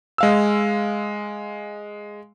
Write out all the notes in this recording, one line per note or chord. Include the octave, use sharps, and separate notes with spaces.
G#3 F5 E6